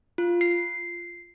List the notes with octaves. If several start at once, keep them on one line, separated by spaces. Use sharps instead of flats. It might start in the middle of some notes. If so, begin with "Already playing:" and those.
F4
C7